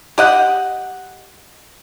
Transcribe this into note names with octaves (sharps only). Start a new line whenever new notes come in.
G4 D#5 F#5